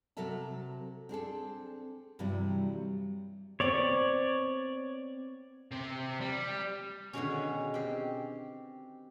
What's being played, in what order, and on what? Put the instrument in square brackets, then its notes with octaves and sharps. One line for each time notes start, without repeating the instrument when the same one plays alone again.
[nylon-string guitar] C3 F#3 A4 A#4 E5 A5
C4 D4 G#4 A4
G2 C3 E3 F#3 G3
[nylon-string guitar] B3 C4 [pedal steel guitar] C#5 D5
[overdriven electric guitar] C3 C4
G3
[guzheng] B2 D3 D#3 G#3 B3 C#4
C4 G4